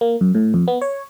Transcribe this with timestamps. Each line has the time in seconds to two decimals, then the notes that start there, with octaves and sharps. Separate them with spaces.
0.01 A#3
0.21 F#2
0.35 A2
0.54 F2
0.68 B3
0.82 C#5